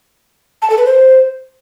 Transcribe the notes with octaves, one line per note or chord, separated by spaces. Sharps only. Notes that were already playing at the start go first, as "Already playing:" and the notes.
A5
A4
B4
C5